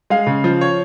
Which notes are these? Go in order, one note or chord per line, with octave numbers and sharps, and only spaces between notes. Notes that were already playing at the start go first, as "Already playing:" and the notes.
G#3 F5
C#3
F3
C#5